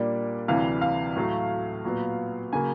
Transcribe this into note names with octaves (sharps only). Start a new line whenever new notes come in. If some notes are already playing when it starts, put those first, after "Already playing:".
Already playing: A#2 G3 A#3 D4
D2 C3 E3 G3 F5
F5
A2 F#3 A3
A#2 F#3 B3
C#3 F#3 A#3 G#5